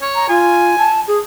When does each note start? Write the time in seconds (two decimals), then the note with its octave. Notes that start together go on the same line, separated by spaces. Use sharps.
0.02 C#5
0.15 A#5
0.29 F4 G#5
0.78 A5
1.08 G#4